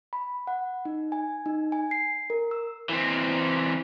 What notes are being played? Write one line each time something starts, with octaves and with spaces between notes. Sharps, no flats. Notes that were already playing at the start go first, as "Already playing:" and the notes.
B5
F#5
D#4
G#5
D#4
G#5
C7
A#4
E6
E3 C4